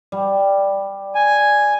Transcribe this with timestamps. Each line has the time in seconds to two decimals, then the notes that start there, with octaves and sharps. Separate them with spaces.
0.12 G3
1.15 G#5